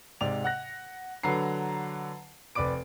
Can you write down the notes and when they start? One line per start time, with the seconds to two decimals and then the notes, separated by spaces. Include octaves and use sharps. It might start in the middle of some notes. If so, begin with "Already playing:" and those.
0.21 G#2 C3 D5 F7
0.44 F#5 F#6 A#6
1.23 D3 F#3 B4 A#5 C7
2.55 F1 B4 D5 D6 D7